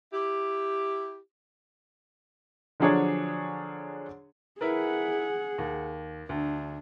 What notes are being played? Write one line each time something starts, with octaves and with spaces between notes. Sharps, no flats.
E4 G4
D3 F3 F#3 D4 G#4 C#5
E4 G#4 A#4 B4 F#5
D#2
D2 D4